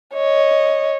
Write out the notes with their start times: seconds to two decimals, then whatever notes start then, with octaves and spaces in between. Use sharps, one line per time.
0.14 C#5 D#5